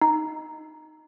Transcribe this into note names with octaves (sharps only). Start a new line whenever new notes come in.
D#4